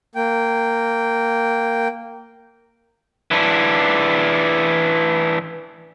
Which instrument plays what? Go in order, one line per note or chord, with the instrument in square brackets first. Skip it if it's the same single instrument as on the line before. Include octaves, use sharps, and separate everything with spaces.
[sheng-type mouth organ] A#3 G5
[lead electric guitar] E3 D4